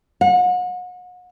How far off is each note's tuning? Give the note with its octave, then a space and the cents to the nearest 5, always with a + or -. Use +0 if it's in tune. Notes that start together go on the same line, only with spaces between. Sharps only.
F#5 -35